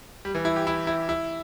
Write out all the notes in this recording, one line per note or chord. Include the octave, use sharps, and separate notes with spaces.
G3
E3
E4
G4
E4
E4
E4